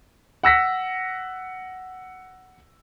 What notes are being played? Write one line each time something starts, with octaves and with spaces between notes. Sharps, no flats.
F#5 E6 A#6 B6